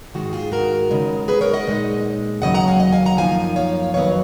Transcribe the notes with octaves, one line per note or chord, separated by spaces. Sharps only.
G#2 D#3 G#3 F#4
F4 G#4
F#4 A#4
C#3 G#3 D#4
G#4 B4
A#4 C#5
D#5 F#5
A#2 G#3 D#4
D#2 C#3 F#3 D#5 F#5
F#5 A#5
F5 G#5
D#5 F#5
F5 G#5
F#5 A#5
F#2 F3 A#3 D#4 F5 G#5
C#5 F5
F2 D#3 F#3 B3 C#5 F5